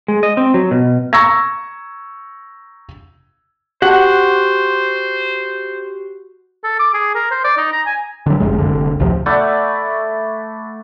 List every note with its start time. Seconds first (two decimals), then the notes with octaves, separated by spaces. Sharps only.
0.08 G#3
0.23 D#5
0.37 C4
0.54 F#3
0.71 B2
1.13 A#5 C#6 E6 G#6 A#6
3.82 F#4 G4 C5 F#5 F#6
6.64 A4
6.79 D6
6.94 G#4
7.15 A#4
7.31 C5
7.44 D5
7.58 D#4
7.72 A#5
7.86 G#5
8.26 D3 F#3
8.40 F1 C#2 F#2 G#3
8.58 F#1 C2 D3
9.00 A1 D2 C3 F3
9.26 A3 E4 D5 F#5